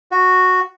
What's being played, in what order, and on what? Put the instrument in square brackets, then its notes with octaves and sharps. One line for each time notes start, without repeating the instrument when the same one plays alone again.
[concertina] F#4